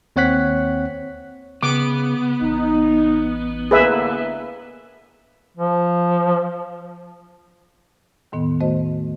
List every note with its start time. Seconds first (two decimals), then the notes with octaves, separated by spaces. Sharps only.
0.16 D#2 C4 C#5 F#5 F#6 B6
1.63 C#3 B3 D6
2.42 A1 D#4
3.71 D2 A2 A#3 G#4 B4 E5
5.57 F3
8.32 E2 A2 D#3 B3
8.60 A3 F#4 C5 D#5